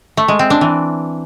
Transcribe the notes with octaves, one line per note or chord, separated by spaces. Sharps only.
A3
G#3
C4
D4
E3